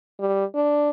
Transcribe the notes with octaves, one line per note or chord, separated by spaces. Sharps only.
G3
D4